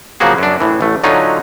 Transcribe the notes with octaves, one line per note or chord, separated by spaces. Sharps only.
C#3 F3 F#3 A#3 F#4 G#4
F#2 D4
A2 E3
A1 A3
D3 F#3 C#4 D#4 F4